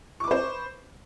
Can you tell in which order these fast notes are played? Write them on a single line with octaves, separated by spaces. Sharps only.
C#6 D6 B4 C5